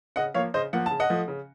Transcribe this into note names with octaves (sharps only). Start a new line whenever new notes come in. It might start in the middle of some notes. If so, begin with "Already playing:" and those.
C#3 D#5 F#5
F3 A#3 C#5 F5
C#3 C5 D#5
F3 A#3 F#5
C#3 A5
D#5 F#5
F3 A3
C#3